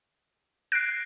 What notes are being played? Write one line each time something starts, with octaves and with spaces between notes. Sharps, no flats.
F#6 A#6 C7 D7